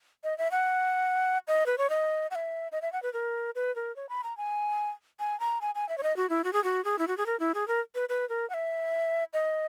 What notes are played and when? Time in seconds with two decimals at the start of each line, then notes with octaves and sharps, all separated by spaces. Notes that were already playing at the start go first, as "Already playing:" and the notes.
0.24 D#5
0.38 E5
0.51 F#5
1.48 D#5
1.66 B4
1.78 C#5
1.90 D#5
2.31 F#5
2.35 E5
2.72 D#5
2.82 E5
2.93 F#5
3.03 B4
3.13 A#4
3.55 B4
3.76 A#4
3.96 C#5
4.09 B5
4.24 A#5
4.37 G#5
5.19 G#5
5.40 A#5
5.61 G#5
5.75 G#5
5.89 E5
5.98 C#5
6.03 D#5
6.17 F#4
6.30 E4
6.44 F#4
6.53 G#4
6.64 F#4
6.85 G#4
6.99 E4
7.08 F#4
7.18 G#4
7.26 A#4
7.40 E4
7.54 G#4
7.68 A#4
7.95 B4
8.09 B4
8.29 A#4
8.50 F#5
8.54 E5
9.33 D#5